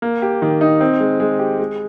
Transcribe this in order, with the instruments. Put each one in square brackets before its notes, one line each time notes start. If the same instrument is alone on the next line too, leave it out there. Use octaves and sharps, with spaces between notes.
[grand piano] A#3
G4
D#3
D#4
C4
G#3
G#3
G4
G#3